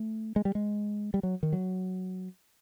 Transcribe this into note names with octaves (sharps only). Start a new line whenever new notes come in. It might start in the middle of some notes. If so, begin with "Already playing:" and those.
Already playing: A3
G#3
G3
G#3
G3
F#3
D#3
F#3